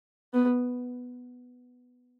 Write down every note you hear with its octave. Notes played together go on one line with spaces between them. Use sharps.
B3